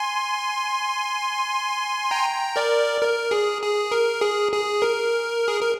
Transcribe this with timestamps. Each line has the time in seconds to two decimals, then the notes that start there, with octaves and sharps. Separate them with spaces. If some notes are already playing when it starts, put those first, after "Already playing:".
Already playing: G#5 C6
2.11 G5 A#5
2.56 A#4 D5
3.01 A#4
3.31 G#4
3.62 G#4
3.92 A#4
4.21 G#4
4.52 G#4
4.82 A#4
5.48 G#4
5.61 A#4